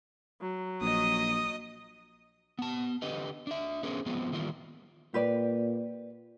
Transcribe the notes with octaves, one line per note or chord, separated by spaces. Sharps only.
F#3
A#1 D#5 D#6
B3 A5
D3 G4 B4 D#5
D4 E5
B3 C#4 G#4 A#4 C5
F3 G#3 B3 C4
D#3 E3 G3 A#3 F4
A#2 G4 B4 D5